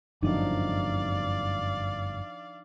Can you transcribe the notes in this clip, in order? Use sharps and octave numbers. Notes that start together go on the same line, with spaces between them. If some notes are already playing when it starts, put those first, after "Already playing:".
G1 F#2 A2 F3 D4 D#4 D5 F5